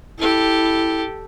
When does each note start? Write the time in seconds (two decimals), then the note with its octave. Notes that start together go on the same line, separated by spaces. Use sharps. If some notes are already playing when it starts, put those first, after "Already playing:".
0.19 E4 G4 A4